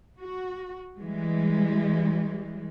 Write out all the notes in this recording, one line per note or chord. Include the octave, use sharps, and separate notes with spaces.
F#4
E3 G3 G#3